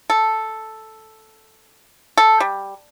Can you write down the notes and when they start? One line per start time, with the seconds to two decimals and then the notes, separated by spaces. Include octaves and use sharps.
0.10 A4
2.17 A4
2.40 G3